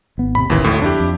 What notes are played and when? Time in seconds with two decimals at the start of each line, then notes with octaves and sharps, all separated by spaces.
0.18 G#1 B3
0.35 A1 E2 C3 B5
0.50 D#1 A1 D#2 C#3 E3
0.64 G1 D2 A2
0.82 F2 D4 E4 G4
1.00 F2